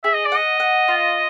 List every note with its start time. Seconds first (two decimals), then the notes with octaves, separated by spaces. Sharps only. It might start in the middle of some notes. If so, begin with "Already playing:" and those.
0.04 G#4 E5
0.14 D#5
0.26 D5
0.32 D#5 F#5
0.60 F#5
0.88 F4